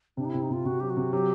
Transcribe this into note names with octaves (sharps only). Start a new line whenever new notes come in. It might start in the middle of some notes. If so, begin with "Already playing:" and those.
C3 D4
D#4
C3 E4
D#4
C3 F4
C3 F#4
F#3 G4
F#4
C3
F#3 G4